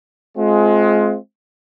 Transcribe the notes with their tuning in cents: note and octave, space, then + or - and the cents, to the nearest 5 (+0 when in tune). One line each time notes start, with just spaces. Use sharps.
G#3 +25 C4 +0 F4 +0